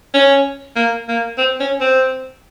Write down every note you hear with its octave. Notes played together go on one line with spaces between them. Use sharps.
C#4
A#3
A#3
C4
C#4
C4